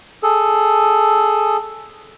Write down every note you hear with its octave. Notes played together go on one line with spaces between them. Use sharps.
G#4 A4